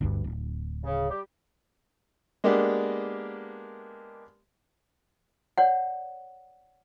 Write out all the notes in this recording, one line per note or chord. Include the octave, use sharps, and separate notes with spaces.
G1 D2 G2
D1
C#3
G3 G4
G#3 A#3 B3 D4 G4
C#5 D5 F#5